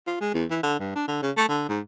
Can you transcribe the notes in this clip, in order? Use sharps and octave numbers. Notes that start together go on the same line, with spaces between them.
F4
G#3
E2
E3
D3
G2
D4
D3
C#3
A3
D3
G#2